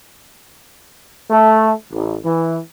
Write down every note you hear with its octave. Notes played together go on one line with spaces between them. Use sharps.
A3
A1
E3